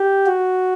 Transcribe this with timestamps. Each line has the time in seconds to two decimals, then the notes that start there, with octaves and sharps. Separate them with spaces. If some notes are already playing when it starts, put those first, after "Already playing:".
Already playing: G4
0.26 F#4